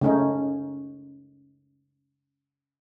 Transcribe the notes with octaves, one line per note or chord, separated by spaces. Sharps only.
C#3 A3 C#4 D#4